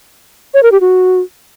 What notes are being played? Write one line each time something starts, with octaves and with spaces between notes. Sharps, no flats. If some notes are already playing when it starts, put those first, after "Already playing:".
C#5
A#4
G4
F#4